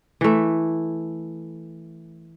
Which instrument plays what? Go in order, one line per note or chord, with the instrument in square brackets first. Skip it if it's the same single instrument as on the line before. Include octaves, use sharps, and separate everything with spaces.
[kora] E3 A3